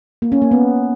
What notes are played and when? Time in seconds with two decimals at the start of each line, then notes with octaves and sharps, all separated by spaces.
0.22 A#3
0.32 C#4
0.42 A#3
0.51 B3